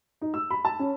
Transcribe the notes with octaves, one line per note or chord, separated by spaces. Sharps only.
D#4
E6
B5
A5
C#4